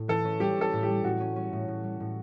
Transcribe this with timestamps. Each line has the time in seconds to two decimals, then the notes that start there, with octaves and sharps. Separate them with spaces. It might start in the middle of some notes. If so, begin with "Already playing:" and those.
Already playing: A2
0.08 E3 A4
0.25 C#4
0.40 G3 G4
0.57 C#4 A4
0.73 A2
0.83 G4
0.89 G3
1.04 A2 F#4
1.20 C#4
1.36 C#4
1.53 A2
1.68 A2
1.84 G3
2.00 A2